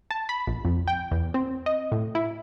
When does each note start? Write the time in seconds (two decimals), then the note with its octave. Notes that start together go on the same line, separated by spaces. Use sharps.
0.11 A5
0.29 B5
0.47 A#1
0.65 F2
0.88 G5
1.11 E2
1.34 C4
1.66 D#5
1.92 A2
2.15 E4